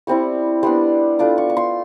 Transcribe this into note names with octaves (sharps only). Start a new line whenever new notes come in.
G3 C4 E4 C#6
G3 B3 D4 C6
A3 D4 F4 D6
C#6
C#6
C6